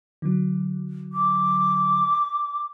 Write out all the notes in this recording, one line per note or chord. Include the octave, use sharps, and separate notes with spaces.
D3 F#3
D6